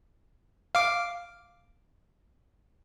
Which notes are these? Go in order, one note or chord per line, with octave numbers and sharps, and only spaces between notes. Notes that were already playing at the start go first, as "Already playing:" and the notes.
F5 D6